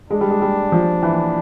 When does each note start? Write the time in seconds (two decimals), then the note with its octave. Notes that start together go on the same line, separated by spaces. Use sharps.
0.10 G#3 D4
0.21 G3
0.30 G#3
0.42 G3
0.72 F3
1.03 E3